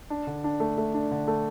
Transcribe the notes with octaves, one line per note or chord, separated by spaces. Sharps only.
D4
D3
D4
A3
A3
D4
D3
A3